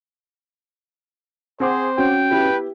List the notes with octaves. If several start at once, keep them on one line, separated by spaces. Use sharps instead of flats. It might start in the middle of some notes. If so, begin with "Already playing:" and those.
C4 G#4 C5 F#5 D6
C#4 F#4 G5
B3 E4 G4 B4